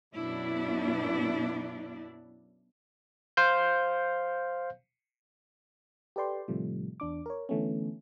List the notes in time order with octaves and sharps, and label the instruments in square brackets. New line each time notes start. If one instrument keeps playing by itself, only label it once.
[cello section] F#2 B2 D4 E4
[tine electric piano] C5 F5 G6
[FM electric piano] G4 A4 B4 D5 G5 C6
A2 C3 D#3 F3 G3 A3
E2 D4 D6
A#4 C#5
D3 E3 A3 B3 C#4